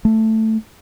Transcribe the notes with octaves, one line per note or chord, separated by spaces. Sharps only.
A3